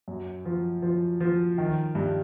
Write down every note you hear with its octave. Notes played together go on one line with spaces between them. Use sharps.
F#2
F3
F3
F3
D#3
G2